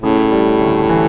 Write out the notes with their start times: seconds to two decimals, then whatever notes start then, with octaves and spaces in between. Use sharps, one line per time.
0.02 A2 C#3
0.31 G3
0.61 D2
0.90 E3